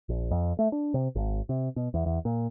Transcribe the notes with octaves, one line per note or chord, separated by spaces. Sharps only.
A#1
F2
A3
D4
C3
G#1
C3
B2
E2
E2
A#2